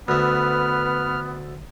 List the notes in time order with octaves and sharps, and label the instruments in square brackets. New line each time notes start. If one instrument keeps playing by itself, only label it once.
[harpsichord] D2 A3 [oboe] B3 [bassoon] B4 [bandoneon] F6